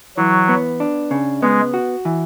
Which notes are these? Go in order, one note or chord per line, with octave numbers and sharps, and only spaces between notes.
E3 F#3
B3
D4
C#3
G#3 B3
F#4
E3